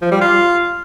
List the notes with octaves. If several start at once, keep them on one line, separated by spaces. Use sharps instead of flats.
F3
G3
F4